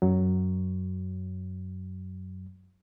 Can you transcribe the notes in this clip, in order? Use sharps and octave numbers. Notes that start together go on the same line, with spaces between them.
F#2 F#3